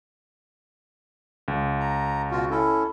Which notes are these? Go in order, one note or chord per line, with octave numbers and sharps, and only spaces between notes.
C#2
A#5
B2 F4 F#4
C#4 E4 A4